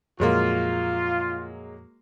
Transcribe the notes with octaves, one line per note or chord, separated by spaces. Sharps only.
F2 A#2 F#3 G#3 A#3 F4